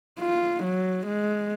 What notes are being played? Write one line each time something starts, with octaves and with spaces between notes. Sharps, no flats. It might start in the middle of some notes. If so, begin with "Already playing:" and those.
F4
F#3
G#3